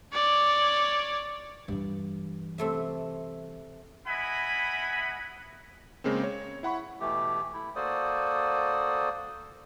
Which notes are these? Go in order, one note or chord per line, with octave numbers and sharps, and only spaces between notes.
C#5 D5
G2 E3
C3 A3 E5
B3 E4 D#5 F#5 G#5 B5
C#3 G#3 A#3 C4
C#5
E4 F#5 B5 C#6
B2 E3 A3 G4
A3 E4
A#3 F#4 A4 C5 D5 D#6